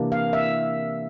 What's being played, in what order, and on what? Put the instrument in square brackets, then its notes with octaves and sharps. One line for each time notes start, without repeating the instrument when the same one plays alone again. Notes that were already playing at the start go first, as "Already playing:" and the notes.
Already playing: [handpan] C3 E3 A#3 D4
F5
E5